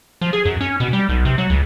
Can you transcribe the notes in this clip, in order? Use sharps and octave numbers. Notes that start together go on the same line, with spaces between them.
F3
G#4
F#2
C#4
B2
G3
B1
C3
F#3
C#2